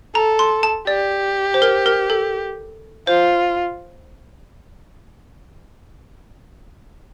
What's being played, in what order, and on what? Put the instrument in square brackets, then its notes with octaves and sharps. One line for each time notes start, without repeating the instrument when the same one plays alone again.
[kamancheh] A4 [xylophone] A#5
[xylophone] C6
A5
[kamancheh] G4 [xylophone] D5
[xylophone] C5
A#4
A#4
A4
[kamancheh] F4 [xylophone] C5